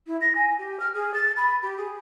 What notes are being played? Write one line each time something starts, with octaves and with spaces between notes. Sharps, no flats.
E4
A#6
G#5
G4
F6
G#4
A6
B5
G4
G#4